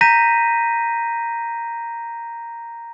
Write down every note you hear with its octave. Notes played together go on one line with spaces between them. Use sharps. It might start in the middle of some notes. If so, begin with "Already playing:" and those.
A#5 G6 A#6 B6 D#7